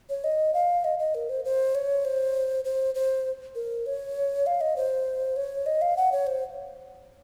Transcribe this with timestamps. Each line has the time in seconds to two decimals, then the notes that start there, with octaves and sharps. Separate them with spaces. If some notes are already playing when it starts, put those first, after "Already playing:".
0.09 C#5
0.24 D#5
0.54 F5
0.84 D#5
0.99 D#5
1.15 A#4
1.29 C5
1.45 C5
1.75 C#5
2.05 C5
2.65 C5
2.95 C5
3.55 A#4
3.86 C#5
4.46 F5
4.61 D#5
4.76 C5
5.36 C#5
5.66 D#5
5.81 F5
5.97 F#5
6.12 C#5
6.27 C5